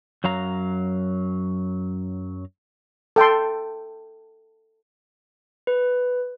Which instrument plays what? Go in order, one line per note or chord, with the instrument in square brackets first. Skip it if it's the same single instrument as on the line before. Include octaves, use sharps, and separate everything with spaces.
[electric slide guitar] F#2 F#3 F5 A#5
[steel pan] A4 G5 A5 C6
[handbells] B4